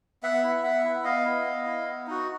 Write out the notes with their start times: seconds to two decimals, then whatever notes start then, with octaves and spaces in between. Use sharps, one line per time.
0.23 B3 E5 F#5
0.43 E4
0.63 B3 E5 F#5
0.84 E4
1.04 B3 D#5 F5
1.25 E4
1.45 B3
1.65 E4
1.87 B3
2.07 D#4 F#4